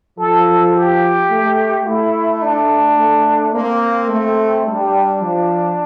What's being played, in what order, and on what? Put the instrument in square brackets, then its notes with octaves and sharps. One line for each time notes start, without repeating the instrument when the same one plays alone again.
[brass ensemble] F3 [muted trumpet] A4
[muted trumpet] G4
[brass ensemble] A3
[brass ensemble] A3 [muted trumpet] E4
[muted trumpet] D4
[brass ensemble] A3
[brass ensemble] A#3 [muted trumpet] C4
[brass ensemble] A3
[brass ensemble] G3 [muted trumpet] D4
[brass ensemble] F3